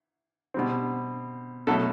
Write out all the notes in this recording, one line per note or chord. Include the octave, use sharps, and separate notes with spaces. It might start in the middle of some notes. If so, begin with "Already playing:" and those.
B2 G3 C4
B2 F#3 A3 A4